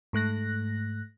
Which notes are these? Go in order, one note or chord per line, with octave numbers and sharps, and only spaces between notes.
G#2 A3 F#6 A#6